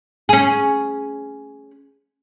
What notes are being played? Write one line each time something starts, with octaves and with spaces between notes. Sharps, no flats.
C#4 G#4